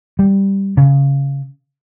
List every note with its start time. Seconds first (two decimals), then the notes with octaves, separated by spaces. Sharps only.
0.19 G3
0.77 C#3